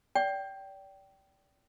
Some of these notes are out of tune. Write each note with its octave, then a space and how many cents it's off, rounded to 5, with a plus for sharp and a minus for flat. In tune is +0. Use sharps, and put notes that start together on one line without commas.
D5 -30 G5 -15